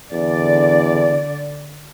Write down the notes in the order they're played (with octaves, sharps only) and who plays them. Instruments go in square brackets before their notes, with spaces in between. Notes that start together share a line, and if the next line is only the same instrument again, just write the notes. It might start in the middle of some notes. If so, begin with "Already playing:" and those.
[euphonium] E2 [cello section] D3 D5